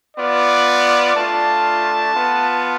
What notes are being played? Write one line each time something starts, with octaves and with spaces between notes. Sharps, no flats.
B3 F4 D5
A3 D4 F4 A5
B3 F4